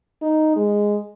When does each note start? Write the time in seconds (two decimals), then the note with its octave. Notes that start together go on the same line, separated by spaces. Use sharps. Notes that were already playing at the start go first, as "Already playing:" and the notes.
0.22 D#4
0.56 G#3